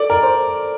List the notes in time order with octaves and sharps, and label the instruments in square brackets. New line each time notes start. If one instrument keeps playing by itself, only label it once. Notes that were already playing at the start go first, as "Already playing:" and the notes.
Already playing: [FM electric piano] A4 [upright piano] D5
[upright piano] A#4
[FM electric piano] C5